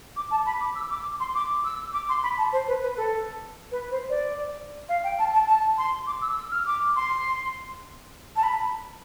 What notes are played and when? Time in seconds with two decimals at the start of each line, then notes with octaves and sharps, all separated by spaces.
0.16 D6
0.30 A5
0.45 B5
0.60 D6
0.75 E6
0.90 D6
1.20 C6
1.34 D6
1.64 E6
1.93 D6
2.08 C6
2.22 B5
2.37 A5
2.52 C5
2.67 B4
2.82 B4
2.96 A4
3.71 B4
3.91 C5
4.09 D5
4.88 F5
5.03 G5
5.18 A5
5.33 A5
5.47 A5
5.77 C6
6.06 D6
6.21 E6
6.37 E6
6.51 F6
6.66 D6
6.95 C6
8.36 A5
8.43 B5